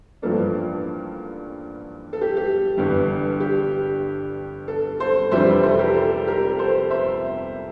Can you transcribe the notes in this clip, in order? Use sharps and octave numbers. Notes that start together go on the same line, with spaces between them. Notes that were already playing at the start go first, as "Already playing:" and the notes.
A1 G2 F3 A#3 D4 A4
A4
G4
G4
G1 G2 E3
G4
A4
A4 C5
F1 F2 E3 G3 D4 C5 E5
A4 C5
G4 A#4
A4
G4 A#4
A4 C5
C5 E5